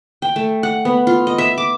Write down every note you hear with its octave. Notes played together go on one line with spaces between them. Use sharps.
G5
A3
F#5
B3
F4
D#5
E5
D6